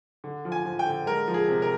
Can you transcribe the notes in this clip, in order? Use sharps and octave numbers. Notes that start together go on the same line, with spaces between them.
D3
F3
G#5
F3
G5
D3
G#3 A#4
F3
G#4
C3
A#4